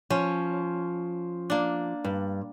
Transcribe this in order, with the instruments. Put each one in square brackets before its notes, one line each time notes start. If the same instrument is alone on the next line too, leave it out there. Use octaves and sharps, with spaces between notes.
[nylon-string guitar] F3 [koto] C#4
[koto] A#3 D4
[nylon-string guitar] G2